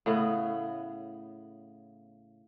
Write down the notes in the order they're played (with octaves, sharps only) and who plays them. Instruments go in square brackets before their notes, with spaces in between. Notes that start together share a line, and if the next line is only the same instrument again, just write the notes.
[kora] A2 C#3 B3